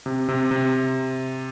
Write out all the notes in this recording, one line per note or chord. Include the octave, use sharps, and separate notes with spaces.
C3
C3
C3